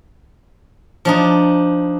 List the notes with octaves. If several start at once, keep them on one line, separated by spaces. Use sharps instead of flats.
F3 D4 D#4